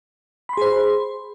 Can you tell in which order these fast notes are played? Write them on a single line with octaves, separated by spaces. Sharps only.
B5 C6 G#4 C5